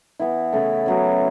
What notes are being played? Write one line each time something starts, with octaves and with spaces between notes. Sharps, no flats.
E3 B3 E4
C#3 A3 E4 A4
C#3 F#3 B3